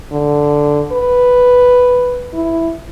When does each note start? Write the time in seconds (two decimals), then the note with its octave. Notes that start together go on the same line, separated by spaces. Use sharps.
0.12 D3
0.92 B4
2.34 E4